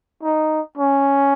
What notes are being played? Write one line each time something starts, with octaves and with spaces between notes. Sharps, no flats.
D#4
C#4